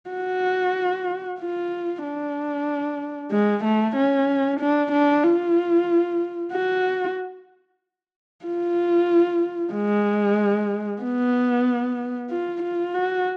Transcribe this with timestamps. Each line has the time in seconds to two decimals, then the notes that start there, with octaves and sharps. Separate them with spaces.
0.10 F#4
1.39 F4
2.03 D4
3.31 G#3
3.64 A3
3.96 C#4
4.60 D4
4.92 D4
5.24 F4
6.52 F#4
8.45 F4
9.74 G#3
11.02 B3
12.31 F4
12.63 F4
12.95 F#4